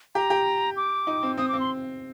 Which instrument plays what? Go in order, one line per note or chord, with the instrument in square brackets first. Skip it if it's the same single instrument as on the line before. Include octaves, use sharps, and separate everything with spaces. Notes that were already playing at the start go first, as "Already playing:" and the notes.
[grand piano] G4 [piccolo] A#5
[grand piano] G4
[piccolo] D6
[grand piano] D#4
C4
[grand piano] C4 [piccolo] D#6
[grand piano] C4 [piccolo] D6
[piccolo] C6